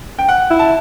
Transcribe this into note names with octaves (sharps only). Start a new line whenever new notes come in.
G5
F#5
E4
A5